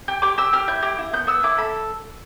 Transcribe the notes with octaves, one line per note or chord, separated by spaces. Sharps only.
G4
G4 D6
G4 E6
G4 F6
E4 G6
G4
E4
B3 G6
B3 E6
E4 D6
A4 B5